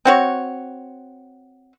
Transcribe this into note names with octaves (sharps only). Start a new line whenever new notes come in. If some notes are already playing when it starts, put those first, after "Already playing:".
C4 F#4 C#5